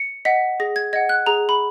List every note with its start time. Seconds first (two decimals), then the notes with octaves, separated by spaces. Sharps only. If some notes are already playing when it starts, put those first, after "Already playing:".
Already playing: C#7
0.25 D#5 F#5 B6
0.60 G#4 A#6
0.76 G#6
0.93 D#5 F#5 G#6
1.09 F#6
1.26 G#4 A#5
1.49 B5